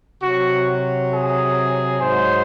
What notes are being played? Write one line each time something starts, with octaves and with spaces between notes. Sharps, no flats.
C3 F#3 F#4
G#4
G#2 F#3 C5